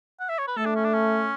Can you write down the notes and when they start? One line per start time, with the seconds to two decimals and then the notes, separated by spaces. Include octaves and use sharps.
0.20 F#5
0.29 E5
0.38 C#5
0.48 B4
0.57 A3 A4
0.65 D4
0.75 C#4
0.84 D4
0.93 C#4